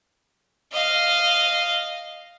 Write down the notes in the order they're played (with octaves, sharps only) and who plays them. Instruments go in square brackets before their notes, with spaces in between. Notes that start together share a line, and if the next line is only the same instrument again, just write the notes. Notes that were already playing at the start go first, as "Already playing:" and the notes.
[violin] D#5 F5